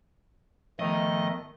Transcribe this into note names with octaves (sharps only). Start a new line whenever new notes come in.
D#3 F3 A3 B3 D#5 A#5